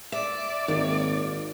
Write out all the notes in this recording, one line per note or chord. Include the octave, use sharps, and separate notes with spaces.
D5 E5
G#1 A#2 D#3